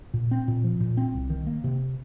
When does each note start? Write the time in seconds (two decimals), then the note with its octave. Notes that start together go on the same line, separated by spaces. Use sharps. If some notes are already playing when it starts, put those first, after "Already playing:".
0.14 A#2
0.31 C4
0.48 A#2
0.64 F3
0.80 A#2
0.97 C4
1.14 C2
1.30 D#3
1.47 A#3
1.64 C3